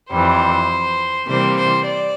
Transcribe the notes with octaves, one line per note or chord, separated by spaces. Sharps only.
F2 E3 G3 C5
C3 E3 G3 A#3 C5
C5
D5